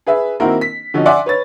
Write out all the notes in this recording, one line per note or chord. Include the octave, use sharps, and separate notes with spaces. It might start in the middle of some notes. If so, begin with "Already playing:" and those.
G#4 B4 E5
D#3 A#3 C4 E4 F#4 A#4
B6
D3 F3 C#4 D#4 F#4
D5 E5 F#5 G#5 C6 D6
B4 C#5 A6